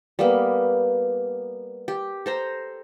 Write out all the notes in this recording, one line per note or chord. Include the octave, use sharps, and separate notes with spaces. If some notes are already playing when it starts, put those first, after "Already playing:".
G3 A#3 B3
G4
A4 C5 A#5